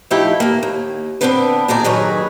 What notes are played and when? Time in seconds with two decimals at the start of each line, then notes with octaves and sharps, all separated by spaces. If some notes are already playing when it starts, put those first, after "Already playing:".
0.11 F3 A3 D#4 E4 G4 G5
0.40 D#2 A#3
0.63 D#2
1.21 D3 B3 C4 D4 D#4 B4
1.68 A#2 D3 D#3 G#4 D5 A#5
1.84 G2 D#3 F#3 G#4 B4